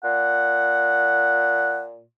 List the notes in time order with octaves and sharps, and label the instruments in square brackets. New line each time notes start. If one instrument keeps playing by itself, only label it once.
[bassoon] A#2 [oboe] F#5